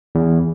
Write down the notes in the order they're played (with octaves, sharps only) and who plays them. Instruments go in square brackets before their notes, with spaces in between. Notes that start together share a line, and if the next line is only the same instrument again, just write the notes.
[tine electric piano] E2